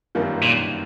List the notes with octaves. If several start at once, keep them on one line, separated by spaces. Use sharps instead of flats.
G1 F#2 D#3 G3 A#3
A#2